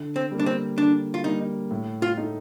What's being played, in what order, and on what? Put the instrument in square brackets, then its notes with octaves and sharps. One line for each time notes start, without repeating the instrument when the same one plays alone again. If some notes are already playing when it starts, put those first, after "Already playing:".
Already playing: [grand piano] D3
[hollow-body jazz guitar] C4
[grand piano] G3 A#3
[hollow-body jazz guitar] D4
C4
[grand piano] D3 [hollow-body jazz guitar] D4
[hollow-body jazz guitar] F4
[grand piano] G3 A#3 [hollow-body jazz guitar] D#4
[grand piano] A2
[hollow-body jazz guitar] F4
[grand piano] A3 D#4